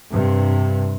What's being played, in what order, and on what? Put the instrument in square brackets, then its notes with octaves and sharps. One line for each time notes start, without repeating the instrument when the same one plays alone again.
[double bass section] G2 C3